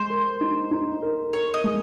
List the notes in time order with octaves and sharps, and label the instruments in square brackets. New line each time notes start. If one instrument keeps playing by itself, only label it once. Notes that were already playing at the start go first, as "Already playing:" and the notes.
Already playing: [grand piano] G#3 [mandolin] C5
[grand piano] A#4
D#4
D#4
A#4
[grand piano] A#4 [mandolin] C#5
[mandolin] D#5
[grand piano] G#3